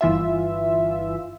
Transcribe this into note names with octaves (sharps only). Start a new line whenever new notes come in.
G1 E3 F4 E5